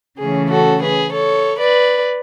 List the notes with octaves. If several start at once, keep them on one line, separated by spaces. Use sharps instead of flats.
C#3 E3 A3 C#4 G#4
F#4 A4
G#4 B4
A4 C#5
B4 D5